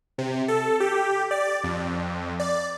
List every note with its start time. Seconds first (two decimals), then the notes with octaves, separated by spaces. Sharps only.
0.18 C3
0.48 A4
0.80 G4
1.31 D5
1.64 F2
2.40 D5